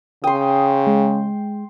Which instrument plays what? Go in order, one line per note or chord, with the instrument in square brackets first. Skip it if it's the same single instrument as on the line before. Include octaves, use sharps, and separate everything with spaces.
[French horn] C#3 [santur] G5 C6 [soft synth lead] D#6
[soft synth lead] G#3